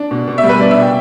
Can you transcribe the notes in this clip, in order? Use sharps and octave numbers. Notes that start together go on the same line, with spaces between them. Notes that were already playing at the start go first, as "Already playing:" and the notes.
Already playing: D4
B2
B2
E5
G3
B4
D4 D5
E5
B2
G5